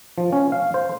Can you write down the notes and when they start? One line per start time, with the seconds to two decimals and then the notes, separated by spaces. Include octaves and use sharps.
0.18 F3
0.33 C#4
0.52 F5
0.74 C5